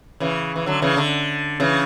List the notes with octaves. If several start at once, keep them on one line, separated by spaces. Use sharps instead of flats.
C#3 E3
E3
D3 F#3
C#3 E3
D3
C#3 E3